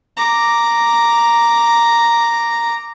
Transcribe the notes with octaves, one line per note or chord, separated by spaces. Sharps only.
A#5 D6